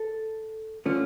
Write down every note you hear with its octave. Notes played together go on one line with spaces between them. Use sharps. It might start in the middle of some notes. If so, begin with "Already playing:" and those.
Already playing: A4
D3 A3 C#4 F4